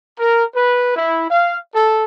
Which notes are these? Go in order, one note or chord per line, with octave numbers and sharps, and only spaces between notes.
A#4
B4
E4
F5
A4